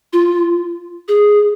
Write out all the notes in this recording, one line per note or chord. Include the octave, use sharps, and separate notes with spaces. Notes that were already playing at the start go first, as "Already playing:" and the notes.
F4
G#4